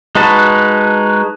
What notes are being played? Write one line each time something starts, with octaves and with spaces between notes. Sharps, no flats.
G#3 D#4 F#4 B4 A5